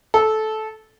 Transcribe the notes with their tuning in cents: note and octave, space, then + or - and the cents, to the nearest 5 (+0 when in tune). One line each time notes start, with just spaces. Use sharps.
A4 -15